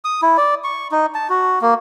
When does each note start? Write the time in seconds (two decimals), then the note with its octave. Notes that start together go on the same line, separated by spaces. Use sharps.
0.05 D#6
0.22 E4
0.37 D5
0.64 C#6
0.92 D#4
1.15 A5
1.30 F#4
1.61 A#3